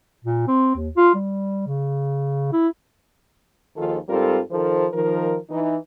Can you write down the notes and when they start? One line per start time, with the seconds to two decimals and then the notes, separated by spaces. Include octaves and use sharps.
0.25 A#2
0.48 C4
0.75 D#2
0.97 F4
1.14 G3
1.67 C#3
2.53 E4
3.77 D#2 D#3 F3 F4 G#4 A4
4.09 G#2 G3 C4 F4 A4 A#4
4.51 D#3 F3 A4 A#4 C5
4.93 D#3 F3 A#4
5.50 E3 D#4